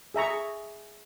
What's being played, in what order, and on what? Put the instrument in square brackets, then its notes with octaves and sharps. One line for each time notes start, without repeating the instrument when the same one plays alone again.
[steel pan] G#4 E5 A#5 C#6